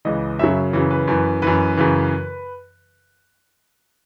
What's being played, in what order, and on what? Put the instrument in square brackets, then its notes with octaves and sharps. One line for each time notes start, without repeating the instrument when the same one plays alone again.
[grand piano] C#2 C#3 E3 D#5
F#2 C#3 F#3 E5
F#2 C#3 E3
B4
F#2 E3
F#2 E3 B4
F#2 C#3 E3